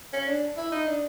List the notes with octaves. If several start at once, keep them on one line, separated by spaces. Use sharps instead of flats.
C#4
D4
E4
D#4
D4